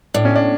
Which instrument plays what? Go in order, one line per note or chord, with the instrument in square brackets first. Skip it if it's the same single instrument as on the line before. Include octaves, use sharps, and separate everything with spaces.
[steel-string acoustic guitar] A2 [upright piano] D4
[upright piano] C#4
D4